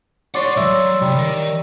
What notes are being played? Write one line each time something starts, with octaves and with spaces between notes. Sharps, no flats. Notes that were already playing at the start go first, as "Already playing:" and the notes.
C#5 D5 F#5 C6
C2 F#3 E5 C6
C3 G3
D#3 A#4